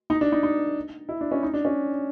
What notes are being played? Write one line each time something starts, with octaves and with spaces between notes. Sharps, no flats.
D#4
D4
D#4
D#4
E4
D4
C#4
D#4
D4
C#4